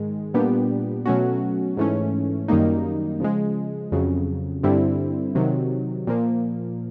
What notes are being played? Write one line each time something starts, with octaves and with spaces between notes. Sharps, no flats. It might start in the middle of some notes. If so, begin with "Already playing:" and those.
Already playing: G#2 D#3 G#3
A#2 G3 B3 D4 G4
B2 F#3 A3 C#4 F#4
G#2 E3 A3 C#4
F#2 D#3 G3 A#3 D#4
C#3 F3 G#3
F2 C#3 F#3
G2 D3 G3 C4 E4
C3 D#3 F#3
A#2 F3 A#3